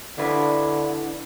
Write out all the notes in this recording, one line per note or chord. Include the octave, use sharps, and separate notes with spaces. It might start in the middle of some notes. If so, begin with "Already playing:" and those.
D3 D4 E4 B4